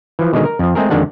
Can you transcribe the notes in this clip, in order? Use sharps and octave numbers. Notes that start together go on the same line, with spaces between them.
E3 F3
B2 D3 D#3 G#3 D#4 G#4
A#4
F2 F3
G#3 A3 C4 G#4 A#4
F2 D3 D#3 G#3 D4 F#5